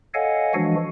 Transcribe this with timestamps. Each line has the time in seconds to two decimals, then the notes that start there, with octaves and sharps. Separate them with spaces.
0.14 A4 C#5 D#5 F5 F#5 G#5
0.54 E3 F3 G#3 D4 F#4